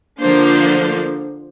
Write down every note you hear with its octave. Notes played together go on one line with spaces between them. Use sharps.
D3 F3 A#3 D4 C5